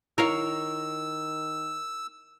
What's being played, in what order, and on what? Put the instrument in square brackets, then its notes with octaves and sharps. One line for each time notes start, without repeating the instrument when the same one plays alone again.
[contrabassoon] D#3 [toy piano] E4 [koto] A#4 C#5 F5 [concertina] E6